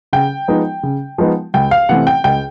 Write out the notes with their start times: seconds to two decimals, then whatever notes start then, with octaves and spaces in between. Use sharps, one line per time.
0.13 C#3 G5
0.48 F3 G#3 B3 D#4
0.83 C#3
1.18 F3 G#3 B3 D#4
1.54 C#2 G5
1.71 F5
1.89 C3 E3 A3 C4 F#5
2.07 G5
2.24 C#2 G5